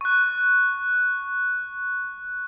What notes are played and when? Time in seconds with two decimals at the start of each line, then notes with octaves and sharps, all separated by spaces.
0.01 C#6 F#6